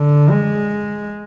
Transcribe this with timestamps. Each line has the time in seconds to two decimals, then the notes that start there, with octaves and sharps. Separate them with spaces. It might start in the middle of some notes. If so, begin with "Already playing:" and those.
Already playing: D3
0.30 G#3